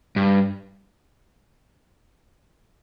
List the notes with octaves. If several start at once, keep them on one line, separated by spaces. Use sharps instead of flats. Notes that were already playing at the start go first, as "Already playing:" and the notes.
G2